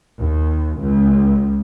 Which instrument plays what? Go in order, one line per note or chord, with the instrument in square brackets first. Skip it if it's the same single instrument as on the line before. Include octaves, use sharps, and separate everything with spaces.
[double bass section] D#2
C#2